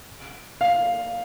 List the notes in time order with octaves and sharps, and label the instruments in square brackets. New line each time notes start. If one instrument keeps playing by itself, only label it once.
[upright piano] F5